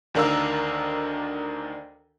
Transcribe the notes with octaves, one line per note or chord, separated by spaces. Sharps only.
D2 D#3 D4 A#4 F5 E6